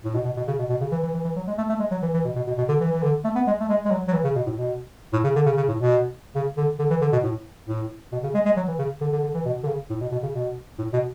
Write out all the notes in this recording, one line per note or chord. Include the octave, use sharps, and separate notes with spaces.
A2
B2
B2
B2
C#3
B2
B2
C#3
E3
E3
E3
E3
F#3
G#3
A3
A3
G#3
F#3
E3
E3
B2
B2
B2
B2
D3
E3
E3
D3
A3
B3
G#3
A3
G#3
G#3
F#3
F#3
E3
C#3
B2
A2
B2
A2
C#3
D3
C#3
C#3
A2
B2
C#3
D3
D3
E3
D3
B2
A2
A2
B2
C#3
G#3
G#3
F#3
E3
C#3
D3
D3
D3
E3
B2
D3
C#3
A2
B2
B2
C#3
B2
A2
B2